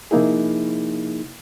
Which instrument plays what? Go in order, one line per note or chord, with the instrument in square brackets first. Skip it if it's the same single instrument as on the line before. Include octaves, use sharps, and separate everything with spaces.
[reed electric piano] C3 F3 A#3 D#4 E4 G#4